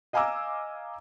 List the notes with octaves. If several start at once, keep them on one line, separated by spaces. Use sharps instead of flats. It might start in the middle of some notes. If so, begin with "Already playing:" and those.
D#5 F5 G#5 A#5 D6 E6